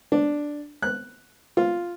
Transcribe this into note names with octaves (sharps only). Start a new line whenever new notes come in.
D4
F#6
F4